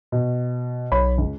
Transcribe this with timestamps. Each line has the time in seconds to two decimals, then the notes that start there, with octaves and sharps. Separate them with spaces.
0.12 B2
0.92 B1 C#5 B5
1.18 C#2